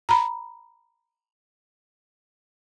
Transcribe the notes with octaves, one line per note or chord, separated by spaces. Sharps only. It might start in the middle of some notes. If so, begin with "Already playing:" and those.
A#5 B5